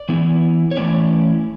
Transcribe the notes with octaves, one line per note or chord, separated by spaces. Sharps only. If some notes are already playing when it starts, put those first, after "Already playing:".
Already playing: D5
E3 B3 E4
C#5
E3 A3 C#4 E4 D5